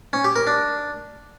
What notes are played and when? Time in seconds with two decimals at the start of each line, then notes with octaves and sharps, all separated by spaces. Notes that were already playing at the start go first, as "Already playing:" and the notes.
0.13 C#4
0.24 G4
0.36 A#4
0.47 D4